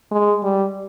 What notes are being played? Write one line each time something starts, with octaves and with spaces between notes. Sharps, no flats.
G#3
G3